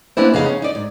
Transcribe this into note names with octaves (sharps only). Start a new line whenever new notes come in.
A#3 B3 C#4 D4 E4 C5
F2 C#3 B3 D#4 G#4 F5
C#4
D#4 D5
G#2